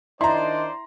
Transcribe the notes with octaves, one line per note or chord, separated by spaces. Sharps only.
D#3 D4 E4 C5 D5 D#5 A#5 C6